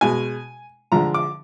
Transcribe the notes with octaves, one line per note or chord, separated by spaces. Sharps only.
B2 G#3 G#5
D3 F3 G#3 A#5
D6